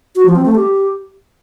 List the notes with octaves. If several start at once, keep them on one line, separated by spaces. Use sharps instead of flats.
F#4
F3
C4
A3
G4